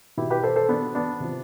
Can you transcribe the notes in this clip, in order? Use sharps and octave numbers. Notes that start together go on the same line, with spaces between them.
B2 E4 G4
G4 B4
A4 C5
A4 C5
B3 D4
B3 D4
C3 F3